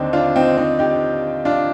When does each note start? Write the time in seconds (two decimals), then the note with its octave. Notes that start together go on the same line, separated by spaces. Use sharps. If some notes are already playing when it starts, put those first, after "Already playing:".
Already playing: D#2 D3 C4 D4 D#4
0.13 D4 F4
0.36 C4 D#4
0.57 C4 D#4
0.79 D#4 G4
1.45 D4 F4